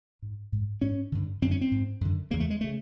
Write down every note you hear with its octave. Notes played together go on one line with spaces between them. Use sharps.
G#2
G#2
G#2 C#4
G2 D3
F#2 D3 C4
C#4
C4
G#2
F#2 D3
E2 C#3 A#3
A3
G#3
C#3 A3